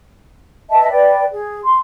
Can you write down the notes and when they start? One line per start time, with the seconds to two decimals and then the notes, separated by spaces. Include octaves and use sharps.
0.70 B4 D#5 E5 A5
0.90 B4 D5 G5
1.31 G#4
1.65 C6